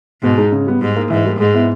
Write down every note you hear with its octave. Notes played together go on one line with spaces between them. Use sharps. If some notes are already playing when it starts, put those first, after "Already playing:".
G#2 B2
G#3 D#4
C#3
G3 B3
G#2 G3
A#3 D#4
G#2 E3
G3 A#3
G#2 G#3
B3 E4